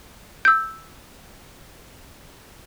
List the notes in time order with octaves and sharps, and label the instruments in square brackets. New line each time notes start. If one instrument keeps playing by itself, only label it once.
[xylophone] E6 G6